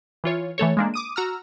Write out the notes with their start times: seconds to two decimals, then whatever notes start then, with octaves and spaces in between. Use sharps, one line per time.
0.24 E3 F4 C#5
0.58 E3 A3 A4 C#5
0.77 G#3 A#3 D4
0.94 D6 D#6 D#7
1.16 F#4 A#5 E6 F6